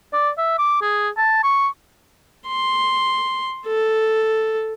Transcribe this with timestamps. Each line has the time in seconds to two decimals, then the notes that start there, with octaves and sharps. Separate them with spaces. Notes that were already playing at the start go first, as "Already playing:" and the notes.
0.13 D5
0.38 E5
0.59 D6
0.82 G#4
1.17 A5
1.44 C#6
2.48 C6
3.67 A4